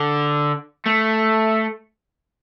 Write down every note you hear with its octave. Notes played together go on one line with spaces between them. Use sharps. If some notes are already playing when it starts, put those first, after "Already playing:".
Already playing: D3
A3